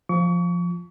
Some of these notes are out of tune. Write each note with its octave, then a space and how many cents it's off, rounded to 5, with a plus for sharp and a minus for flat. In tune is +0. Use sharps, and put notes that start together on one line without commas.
F3 +0 C#6 +35